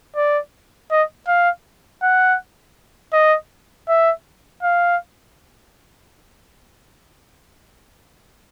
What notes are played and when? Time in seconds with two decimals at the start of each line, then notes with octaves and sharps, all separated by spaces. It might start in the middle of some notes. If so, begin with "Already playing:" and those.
0.16 D5
0.91 D#5
1.27 F5
2.03 F#5
3.13 D#5
3.89 E5
4.63 F5